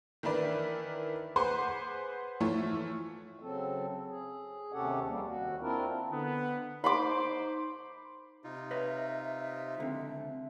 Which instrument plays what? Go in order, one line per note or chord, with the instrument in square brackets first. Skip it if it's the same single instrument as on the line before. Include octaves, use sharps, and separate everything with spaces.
[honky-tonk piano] D#3 E3 D4 E4 B4 D5
G#4 B4 C5 F#5 C6 D6
E3 F3 A3 F4 C#5
[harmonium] C#3 F#3 C4 A4
G#4
D#2 C3 C#4 G4 A4 F#5
F2 G3 A#3
D#2 F#4
C4 D4 E4 F4 A#4
[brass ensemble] D3 B3
[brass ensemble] D#4 C5 [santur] B5 C6 D6
[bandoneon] C3 D#4 F4
[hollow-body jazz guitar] B4 C#5 D#5 [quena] E5
[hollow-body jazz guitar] C#2 D3 C4